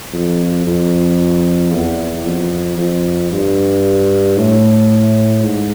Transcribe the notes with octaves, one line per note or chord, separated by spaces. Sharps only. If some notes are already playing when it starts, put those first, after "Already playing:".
F2
F2
E2
F2
F2
G2
A2
G#2